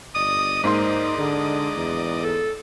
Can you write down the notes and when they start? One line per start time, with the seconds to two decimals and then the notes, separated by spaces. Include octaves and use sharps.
0.15 G1 D5 D#5 D#6
0.64 G#2 A#3 D#4 C5 C6
1.18 D3 G#4
1.77 E2
2.23 A4